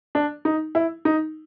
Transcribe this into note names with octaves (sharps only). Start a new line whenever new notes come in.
D4
D#4
E4
D#4